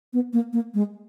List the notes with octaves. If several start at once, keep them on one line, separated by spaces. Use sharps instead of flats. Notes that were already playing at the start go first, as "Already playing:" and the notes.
B3
A#3
A#3
G#3